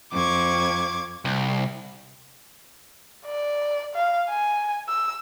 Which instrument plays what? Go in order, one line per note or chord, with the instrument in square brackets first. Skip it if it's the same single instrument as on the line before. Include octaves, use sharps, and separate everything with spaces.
[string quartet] F2 C#6 G#6 [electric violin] D6
[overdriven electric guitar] C2
[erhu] D5
F5
G#5
E6